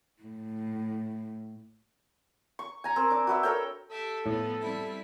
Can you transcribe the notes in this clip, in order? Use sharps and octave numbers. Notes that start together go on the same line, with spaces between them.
A2
C#6
G#5 A#5
C4 A#4
D4 D6
F#4 B4 E5
A4 A#4 C#5 G5
G4 A4 E5
A2 F3 B3
G3 C4 E4